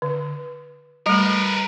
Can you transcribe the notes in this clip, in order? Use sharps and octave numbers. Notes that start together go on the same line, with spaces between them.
D3
G3 A3 A#4 B4